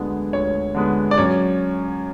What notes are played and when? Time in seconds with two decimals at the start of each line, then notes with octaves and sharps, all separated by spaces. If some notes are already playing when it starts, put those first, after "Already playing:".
Already playing: D2 D3 G#3 B3
0.33 D2 C#5
0.75 D3 G#3 B3
1.11 D5
1.18 F#2 C#5